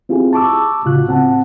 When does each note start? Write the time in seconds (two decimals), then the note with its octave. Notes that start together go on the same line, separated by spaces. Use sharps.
0.09 C4 E4 F4 G4 G#4
0.33 A5 C#6 D6 E6
0.85 C#2 A2 C#3 F4 F#4 F#6
1.08 C4 F#5 A5